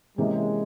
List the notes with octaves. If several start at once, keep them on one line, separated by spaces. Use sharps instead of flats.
C3 E3 G#3 A#3 C#4 G4